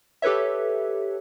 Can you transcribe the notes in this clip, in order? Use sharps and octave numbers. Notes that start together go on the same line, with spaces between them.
G4 A4 B4 C#5 E5